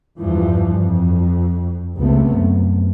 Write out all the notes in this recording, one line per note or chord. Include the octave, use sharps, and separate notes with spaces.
E2 G2 E3 F3
F2
C#2 C3 A3 B3 C4
F#2